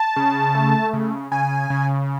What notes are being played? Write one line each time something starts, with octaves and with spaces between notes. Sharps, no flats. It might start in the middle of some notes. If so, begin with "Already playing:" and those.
Already playing: A5
C#3
A3
C#3
C#3 G#5
C#3